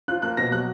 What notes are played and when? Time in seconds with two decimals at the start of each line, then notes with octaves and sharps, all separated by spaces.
0.08 F4 F#6
0.22 A#3 F#6
0.37 B2 A#6
0.52 F#3 F#6